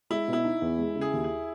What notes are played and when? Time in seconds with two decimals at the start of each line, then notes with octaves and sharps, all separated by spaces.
0.10 G#3 E4
0.28 B2
0.33 E4
0.44 D#4
0.62 E2
0.79 G#3
0.96 C#3
1.01 G#4
1.13 D#2
1.24 G#4